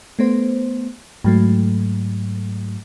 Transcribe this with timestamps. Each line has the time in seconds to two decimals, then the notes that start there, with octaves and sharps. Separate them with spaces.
0.19 A3 B3 C5
1.24 G#2 F#3 A3